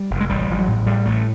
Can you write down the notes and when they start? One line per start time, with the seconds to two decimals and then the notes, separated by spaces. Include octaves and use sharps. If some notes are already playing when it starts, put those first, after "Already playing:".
Already playing: G3
0.10 F1
0.20 G#3
0.29 A1 G3
0.48 A1 F3
0.59 F#3
0.68 A2
0.86 A2 G3
1.06 A1 A3